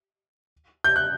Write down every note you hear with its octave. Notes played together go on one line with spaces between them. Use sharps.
G6
F#6